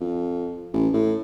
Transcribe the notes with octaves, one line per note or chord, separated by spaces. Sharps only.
F2
A1
A2